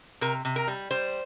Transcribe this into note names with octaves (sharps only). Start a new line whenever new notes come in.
C3 A#4
C3
A#4
G3
G3 C5